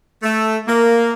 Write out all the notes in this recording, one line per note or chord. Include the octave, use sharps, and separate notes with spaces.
A3
A#3